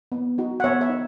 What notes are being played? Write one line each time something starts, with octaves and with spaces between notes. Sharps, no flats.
B3
D#4 F#4
F#5
B3 C#5 E5
C#5 E5
D#4